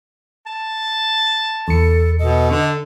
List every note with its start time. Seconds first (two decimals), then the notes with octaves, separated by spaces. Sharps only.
0.46 A5
1.68 E2 A4 C#7
2.19 B2 A4 D#5
2.51 D3